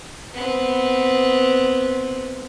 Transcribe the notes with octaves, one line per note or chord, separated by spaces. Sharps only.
B3 C4